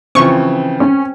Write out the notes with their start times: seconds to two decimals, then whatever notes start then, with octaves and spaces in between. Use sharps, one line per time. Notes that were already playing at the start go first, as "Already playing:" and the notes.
0.15 C#3 E3 F3 C4 C#6
0.80 C#4